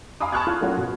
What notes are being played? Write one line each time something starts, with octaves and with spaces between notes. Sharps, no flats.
F5 G#5 A#5 B5 D6 D#6
A5 B5 C#6 F6 F#6 G#6
F4
F#3 A3 A#3 C#4 F4 F#4
B2